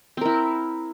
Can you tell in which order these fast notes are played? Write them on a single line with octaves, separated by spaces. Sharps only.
C4 A#4 E4